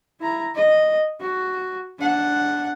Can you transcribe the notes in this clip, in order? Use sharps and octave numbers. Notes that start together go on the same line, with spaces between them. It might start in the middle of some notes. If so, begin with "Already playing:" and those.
E4 A#5
D#5
F#4
D4 F#5